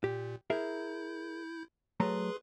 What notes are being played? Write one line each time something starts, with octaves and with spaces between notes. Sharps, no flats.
A#2 G4
E4 G#4 A#4 E5 G6
F#3 A3 G#4 B4 A#5 C6